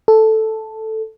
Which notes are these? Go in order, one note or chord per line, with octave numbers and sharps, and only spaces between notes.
A4